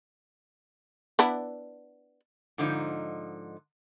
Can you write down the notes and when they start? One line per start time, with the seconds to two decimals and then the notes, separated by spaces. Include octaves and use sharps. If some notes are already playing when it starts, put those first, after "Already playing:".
1.19 B3 D4 E4
2.58 G#2 D3 F3 D#4